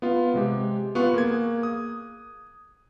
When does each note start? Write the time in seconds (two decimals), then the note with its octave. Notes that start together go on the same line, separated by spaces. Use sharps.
0.02 B3 F4
0.34 C3 G#3 G4
0.95 B3 F4 C#6 F#6
1.14 A#3 G#4 G#6
1.63 D#6